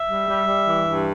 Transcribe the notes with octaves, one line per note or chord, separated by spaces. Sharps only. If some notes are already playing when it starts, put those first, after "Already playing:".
Already playing: E5
G3
G3
G3
E3
G2